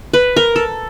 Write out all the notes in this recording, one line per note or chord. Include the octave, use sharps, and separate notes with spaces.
B4
A#4
A4